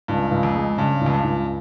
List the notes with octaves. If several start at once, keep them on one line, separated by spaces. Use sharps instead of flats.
C#2 G2
C#2
F2
G#3
G2 C#3
C#2
F2
G2
C#2